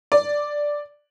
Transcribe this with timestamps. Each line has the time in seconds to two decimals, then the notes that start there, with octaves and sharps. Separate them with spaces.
0.12 D5